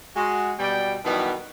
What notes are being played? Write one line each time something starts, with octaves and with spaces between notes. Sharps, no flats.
G#3 F#4
B2 G3 G5
B2 D#3 E3 F#3 G3 B3